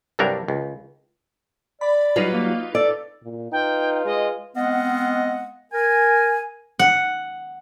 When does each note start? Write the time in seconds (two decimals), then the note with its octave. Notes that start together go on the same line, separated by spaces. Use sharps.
0.19 C2 G2 F#3 G3 D4 A#4
0.48 C#2
1.81 D5 B5
2.16 F#3 G3 D#4 F4 B4
2.34 A#3
2.75 A4 D5
3.23 A#2
3.52 D#4 F4 B4 G5
4.05 G#3 D#5
4.56 G#3 B3 C4 D#5 F5 F#5
5.72 A#4 G#5
6.79 F#5